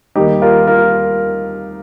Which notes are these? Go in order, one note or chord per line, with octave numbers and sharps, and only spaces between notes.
D#2 D#3 G3 D#4 G4
F4 A#4
F4 A#4